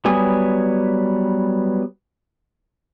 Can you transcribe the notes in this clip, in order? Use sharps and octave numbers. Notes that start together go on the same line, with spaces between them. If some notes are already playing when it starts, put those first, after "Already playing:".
F#3 G3 B3 G#5 D#6